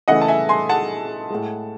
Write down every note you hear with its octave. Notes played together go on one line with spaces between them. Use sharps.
C#3 E3 A3 D#5 F#5
A5
E5 G#5
G#5 C6
F#5 A5
A2 G#3